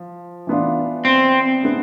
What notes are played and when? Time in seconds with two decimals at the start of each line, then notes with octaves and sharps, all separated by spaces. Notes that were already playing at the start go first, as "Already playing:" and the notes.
Already playing: F3
0.47 E3 B3 D4 F4
1.05 C4
1.63 D3 G#3 B3 E4